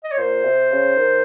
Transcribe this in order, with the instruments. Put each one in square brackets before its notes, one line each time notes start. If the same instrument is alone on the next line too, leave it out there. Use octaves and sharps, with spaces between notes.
[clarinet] D#5
C#5
[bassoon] A#2 [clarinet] C5
[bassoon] C3
C#3
D#3